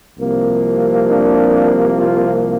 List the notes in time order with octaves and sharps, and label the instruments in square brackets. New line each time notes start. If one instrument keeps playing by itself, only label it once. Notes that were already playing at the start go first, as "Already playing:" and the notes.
[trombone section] C2 C3 F3 A#3
D4
F4